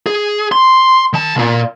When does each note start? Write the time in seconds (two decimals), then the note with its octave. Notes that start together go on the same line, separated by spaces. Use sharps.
0.06 G#4
0.52 C6
1.13 D#3 A5
1.35 C2 A#2